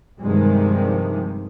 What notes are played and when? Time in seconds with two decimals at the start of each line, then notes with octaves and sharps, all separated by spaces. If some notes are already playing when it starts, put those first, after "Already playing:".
0.21 G2 C3 D#3 F3 G3 G#3